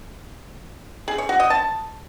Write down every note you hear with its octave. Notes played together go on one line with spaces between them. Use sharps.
G#4
C#5
F#4
D#5
A5